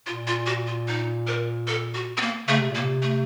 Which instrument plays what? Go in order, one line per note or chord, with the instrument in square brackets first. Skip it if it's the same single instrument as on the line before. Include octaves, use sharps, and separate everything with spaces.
[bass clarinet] A#2 [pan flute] F4
[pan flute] F4
F#4
F4
D#4
A#4
A4
F#4
C4
A#3
[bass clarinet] C#3 [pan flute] A3
[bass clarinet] C3
A#2
[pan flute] A#3
[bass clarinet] C3
[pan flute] A3